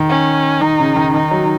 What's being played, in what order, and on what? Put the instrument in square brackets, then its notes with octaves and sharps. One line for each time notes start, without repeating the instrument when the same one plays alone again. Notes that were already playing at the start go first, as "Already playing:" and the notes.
Already playing: [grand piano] D#3
[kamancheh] C#4
[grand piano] D#3 [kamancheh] D#4
[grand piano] C#3
D#3
[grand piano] D#3 [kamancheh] D#4
[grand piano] F#3